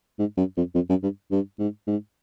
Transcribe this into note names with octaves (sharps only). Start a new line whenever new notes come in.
G#2
F#2
F2
F2
F#2
G2
G2
G#2
G#2